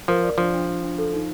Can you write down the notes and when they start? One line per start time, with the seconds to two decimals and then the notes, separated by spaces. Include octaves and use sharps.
0.08 F3 A#4
0.23 D5
0.38 F3 D4
0.54 D4
0.67 D4
0.82 D4
0.98 A4
1.13 D#4